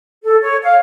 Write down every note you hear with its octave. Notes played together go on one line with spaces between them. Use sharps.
A4
C#5
F5